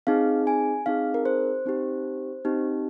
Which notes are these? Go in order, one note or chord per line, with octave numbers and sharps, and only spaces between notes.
C4 D#4 G#4 F5
G#5
C4 D#4 G#4 F5
A#4
C5
C4 D#4 G4
C4 D#4 G4